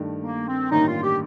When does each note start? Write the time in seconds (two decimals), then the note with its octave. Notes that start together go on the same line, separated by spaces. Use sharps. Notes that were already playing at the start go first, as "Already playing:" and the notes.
Already playing: G2 D#3 A3
0.23 A#3
0.48 C4
0.71 A1 G2 D#3 A#3 D#4
0.87 F4
1.03 G4